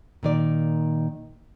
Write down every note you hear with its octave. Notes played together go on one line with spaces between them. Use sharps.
A#2 D#3 D5